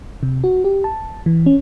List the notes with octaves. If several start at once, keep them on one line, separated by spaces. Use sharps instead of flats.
C3
F#4
G4
A5
E3
C#4